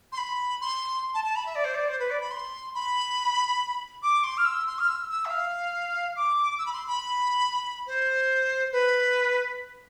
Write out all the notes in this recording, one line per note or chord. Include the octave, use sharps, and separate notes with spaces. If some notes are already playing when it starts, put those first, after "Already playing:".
C6
B5
C6
A5
A5
B5
E5
D5
C5
D5
C5
B4
D5
B5
C6
B5
D6
C6
F6
E6
C6
F6
E6
E6
E5
F5
D6
E6
B5
C6
B5
C5
B4